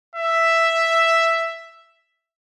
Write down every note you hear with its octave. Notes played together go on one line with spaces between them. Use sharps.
E5